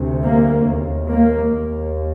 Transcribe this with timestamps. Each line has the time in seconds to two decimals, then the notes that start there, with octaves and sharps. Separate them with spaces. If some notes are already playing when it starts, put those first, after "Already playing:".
Already playing: D2 C3
0.23 A#3
0.67 D#2
1.09 A#3
1.53 D#2